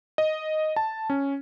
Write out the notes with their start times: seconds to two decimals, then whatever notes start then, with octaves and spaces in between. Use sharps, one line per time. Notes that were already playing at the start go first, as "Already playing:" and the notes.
0.18 D#5
0.76 A5
1.10 C#4